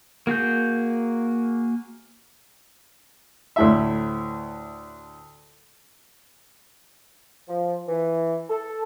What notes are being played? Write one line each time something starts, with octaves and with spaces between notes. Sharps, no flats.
A#3 F#4 G#4 G6
D2 A2 E5
F3
E3
A4